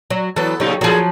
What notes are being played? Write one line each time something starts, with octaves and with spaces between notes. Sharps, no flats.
F#3
E3 F#3 B3 A4
A#2 C#3 F#3 D#4 G4
F3 F#3 A#3 G#4 A4